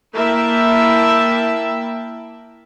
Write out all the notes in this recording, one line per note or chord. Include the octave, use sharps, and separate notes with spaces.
A#3 E4 E5 G5 A5